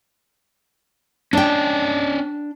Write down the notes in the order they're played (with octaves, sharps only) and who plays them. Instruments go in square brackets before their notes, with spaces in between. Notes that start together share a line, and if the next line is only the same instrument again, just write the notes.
[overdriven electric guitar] C#4 D5 [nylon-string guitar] D4 G5